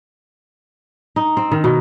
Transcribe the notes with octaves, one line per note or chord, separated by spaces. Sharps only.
D#4
C4
D#3
B2